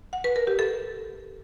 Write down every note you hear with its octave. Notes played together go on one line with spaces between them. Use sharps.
F#5
B4
A#4
G4
A4